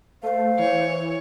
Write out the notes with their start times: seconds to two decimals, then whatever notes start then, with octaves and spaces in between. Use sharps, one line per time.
0.23 A3 C5 F5
0.59 E3 C#5